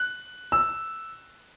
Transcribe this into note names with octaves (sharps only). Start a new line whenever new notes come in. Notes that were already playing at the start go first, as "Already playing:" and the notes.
Already playing: F#6
E6